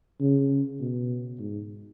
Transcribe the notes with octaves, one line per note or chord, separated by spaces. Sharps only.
C#3
B2
G#2